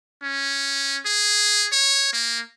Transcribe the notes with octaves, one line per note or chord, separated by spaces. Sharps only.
C#4
G#4
C#5
A#3